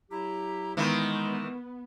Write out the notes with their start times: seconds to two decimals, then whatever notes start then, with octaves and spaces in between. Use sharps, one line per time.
0.11 F#3 E4 G4 A#5
0.77 D#3 E3 G#3 B3 D#4